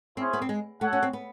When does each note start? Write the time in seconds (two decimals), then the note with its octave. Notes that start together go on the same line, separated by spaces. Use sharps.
0.17 C4 C#4 E4 G#4 C5
0.33 B3
0.42 C4
0.49 G#3
0.81 A3 F#4 A4 C#5 F#5
0.93 C#4
1.03 C4
1.13 B3